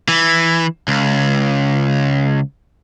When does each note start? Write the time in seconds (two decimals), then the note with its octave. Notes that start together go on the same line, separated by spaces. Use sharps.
0.08 E3
0.88 C#2